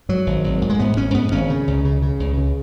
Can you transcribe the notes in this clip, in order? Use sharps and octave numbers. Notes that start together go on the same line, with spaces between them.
G#2 F#3
G#1
G#1
G#2
G#3
G#2 B3
G#1 C#4
G#2 B3
G#1 C#4
C#3
C#2
C#3
C#3
C#2
C#3